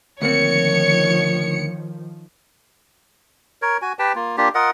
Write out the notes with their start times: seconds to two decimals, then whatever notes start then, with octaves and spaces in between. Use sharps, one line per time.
0.22 D2 D#3 F3 A#3 C4 C#5 C#7
3.62 A#4 C#5
3.82 F#4 G#5
3.99 G4 B4 G5 A5
4.15 A#3 F4
4.37 A#3 D4 F4 G4
4.55 F4 A#4 D#5 F#5